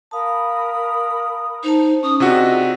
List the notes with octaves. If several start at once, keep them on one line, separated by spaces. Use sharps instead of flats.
A#4 F5 A5 B5 D#6
D#4 C5 A5
C#4 D#6
C3 D#4 F4 F#4 G#4 D5 D#5 E6